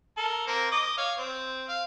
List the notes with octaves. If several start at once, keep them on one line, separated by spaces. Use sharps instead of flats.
A4 A#4
A#3 C4 A#4
D#5 D6 D#6
C#5 F5
C4
F5